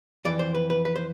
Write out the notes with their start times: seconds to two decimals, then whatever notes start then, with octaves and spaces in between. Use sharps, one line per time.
0.25 F2 E3 D5
0.39 C5
0.55 B4
0.70 B4
0.85 B4
0.96 C5